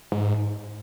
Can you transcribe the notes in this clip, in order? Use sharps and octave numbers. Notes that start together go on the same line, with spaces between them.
G#2